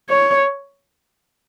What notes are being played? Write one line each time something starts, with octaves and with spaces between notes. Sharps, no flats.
C#5